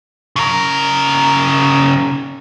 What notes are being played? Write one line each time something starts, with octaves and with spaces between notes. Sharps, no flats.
C#3 A#4